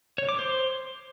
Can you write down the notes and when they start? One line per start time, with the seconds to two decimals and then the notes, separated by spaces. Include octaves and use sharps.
0.18 C#5
0.29 D6
0.39 C5